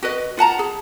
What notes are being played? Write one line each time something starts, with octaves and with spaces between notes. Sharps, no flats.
F#4 B4 D#5
F4 F#5 A5 A#5
G#4